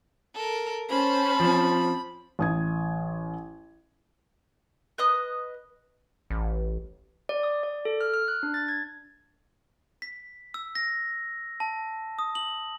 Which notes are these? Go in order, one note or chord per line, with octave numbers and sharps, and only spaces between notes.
A4 A#4
C#4 C5 A5 B5
F3 C4
A1 D#6 G#6
B4 D#5 D#6 F#6
A1
D5
D#6
D5
A4
F6
F6
F#6
D4
A6
G#6
B6
E6
A#6
A5
D#6
F#7